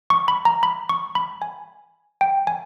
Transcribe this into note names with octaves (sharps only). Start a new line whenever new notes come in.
C#6
B5
A#5
B5
C#6
B5
G#5
G5
G#5